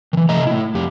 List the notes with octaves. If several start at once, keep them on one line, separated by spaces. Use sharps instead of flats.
D#3 E3
C3 A3 A4 D#5 A#5
A3 E4
F2 G4